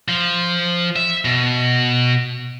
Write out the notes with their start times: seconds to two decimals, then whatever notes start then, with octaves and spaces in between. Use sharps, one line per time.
0.08 F3
0.96 E5
1.25 B2